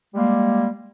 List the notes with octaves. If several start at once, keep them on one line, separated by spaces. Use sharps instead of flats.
G3 G#3 A#3